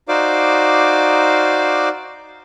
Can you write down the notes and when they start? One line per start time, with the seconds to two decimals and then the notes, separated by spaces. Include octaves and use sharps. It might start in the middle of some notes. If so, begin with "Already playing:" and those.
0.08 D#4 F#4 C5 D5 F5 D6